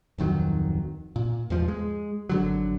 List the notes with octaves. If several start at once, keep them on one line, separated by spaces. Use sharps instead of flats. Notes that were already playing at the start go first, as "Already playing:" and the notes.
D1 F2 D#3 F#3
A#2
E2 G#2 F3
G#3
G#1 D3 F#3